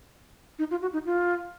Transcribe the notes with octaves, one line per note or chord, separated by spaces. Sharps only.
D#4
F4
F#4
D#4
F4